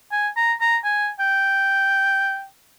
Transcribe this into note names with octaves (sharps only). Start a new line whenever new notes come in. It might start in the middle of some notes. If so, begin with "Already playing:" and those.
G#5
A#5
A#5
G#5
G5